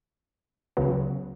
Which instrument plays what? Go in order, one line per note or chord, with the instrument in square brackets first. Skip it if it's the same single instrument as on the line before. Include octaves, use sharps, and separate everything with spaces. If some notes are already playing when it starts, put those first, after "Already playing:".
[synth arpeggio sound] C#2 C#3 F#3 B3